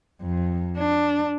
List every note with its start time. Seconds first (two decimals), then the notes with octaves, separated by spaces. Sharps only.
0.21 F2
0.78 D4